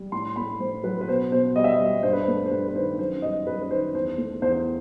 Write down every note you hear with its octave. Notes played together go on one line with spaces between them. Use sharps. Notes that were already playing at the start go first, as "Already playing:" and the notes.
Already playing: G3
A2 C6
A3 B5
A2 C5
F#3 B4
B4
B2 C5
B2 C5
G3 D#5
E5
D#5
G3
G2 C5
B4
C5
A3
C5
G2 B4
B4
D#3 C5
F#2 C5
G3 D#5
F#2 B4
B4
D#3 C5
E2 C5
A3
E2 C5